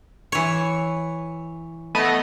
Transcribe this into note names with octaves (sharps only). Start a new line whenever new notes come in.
E3 C#5
A3 B3 D#5